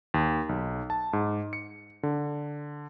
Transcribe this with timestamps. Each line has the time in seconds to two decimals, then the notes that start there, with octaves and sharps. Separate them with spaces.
0.14 D#2
0.49 B1
0.90 A5
1.13 G#2
1.53 C#7
2.03 D3